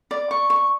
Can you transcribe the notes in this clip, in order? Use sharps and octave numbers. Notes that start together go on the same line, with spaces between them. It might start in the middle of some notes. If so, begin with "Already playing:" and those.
D5
C#6
C#6